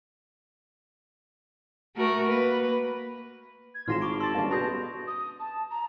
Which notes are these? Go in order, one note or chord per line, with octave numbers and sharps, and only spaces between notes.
A3 F#4 A#4
A#3 B4
G#6
G#1 A2 D#3 F4 C6 F6 A#6 E7
B5 C#6 D6 D7
A5 C6 E6 A6
G1 A#3 C#4
B2 D4 G#4 B5 G6 A#6
D#6
A5
A#5